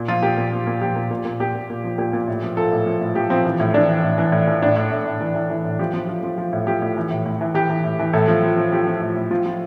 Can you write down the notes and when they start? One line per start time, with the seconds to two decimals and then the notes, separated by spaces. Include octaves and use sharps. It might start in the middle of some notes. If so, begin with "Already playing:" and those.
Already playing: A#2
0.08 F3 F4
0.22 A#2 G4
0.37 A#2
0.52 F3
0.67 A#2
0.81 F3 G4
0.96 A#2
1.11 A#2
1.25 A#2
1.40 A#2 G4
1.55 A#2
1.70 A#2
1.84 F3
1.98 A#2 G4
2.13 A#2
2.28 A2
2.43 F3
2.57 F3 A4
2.72 A2
2.86 F3
3.01 A2
3.15 F3 G4
3.30 F3 C4
3.45 E3
3.60 A2
3.74 E3 D4
3.89 E3
4.04 A2
4.18 E3
4.32 A2
4.47 E3
4.62 A2 D4
4.76 A2
4.92 A2
5.05 A2
5.21 E3
5.35 E3
5.50 E3
5.65 A2
5.79 F3 G4
5.94 F3
6.08 F3
6.23 F3
6.38 F3
6.53 A2
6.67 F3 G4
6.82 A2
6.97 E3
7.11 A2
7.26 A2
7.41 E3
7.54 E3 G4
7.70 E3
7.84 A2
7.99 E3
8.13 A2 A4
8.28 F3
8.43 F3
8.57 F3
8.72 F3 G4
8.87 F3
9.01 A2
9.16 A2
9.31 F3 F4
9.46 F3